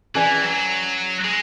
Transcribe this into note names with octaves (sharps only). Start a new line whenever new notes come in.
E3 C#4 G#4 B4 D5 G#5
F#3
G#3